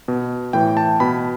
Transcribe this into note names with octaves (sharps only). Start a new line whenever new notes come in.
B2
A2 E3 G5
A5
B2 B5